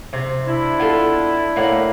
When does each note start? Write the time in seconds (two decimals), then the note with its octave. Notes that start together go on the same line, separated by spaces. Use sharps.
0.13 C3
0.46 D4 E4
0.79 B3 F4 A4
1.56 A2 A#3 F#5